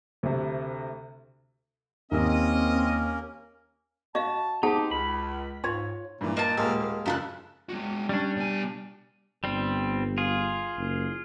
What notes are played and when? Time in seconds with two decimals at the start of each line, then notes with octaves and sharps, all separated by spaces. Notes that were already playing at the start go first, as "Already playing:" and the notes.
0.23 D2 C3
2.11 D#2 A#3 C4 C#4 A#4 D#5
4.15 F#4 D#5 F5 A5
4.63 C4 D#4 G4 G#4 C5 F#5 A5
4.91 C#2 B5
5.64 G#2 F4 C#5
6.21 G2 A#2 E3
6.37 A#3 D#5 A5
6.57 D#1 G#3 A#3 G4 E6
6.79 A#3
7.06 F#2 C#3 F4 A4 B5 F#6
7.69 G#3 F#4
8.09 G3 C#4 D4
8.36 B2 G#5
9.44 G1 G3 C4
10.18 F4 G#4
10.77 F#1